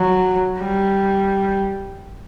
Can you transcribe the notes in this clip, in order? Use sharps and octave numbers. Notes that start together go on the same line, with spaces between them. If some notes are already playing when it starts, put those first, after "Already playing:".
Already playing: F#3
G3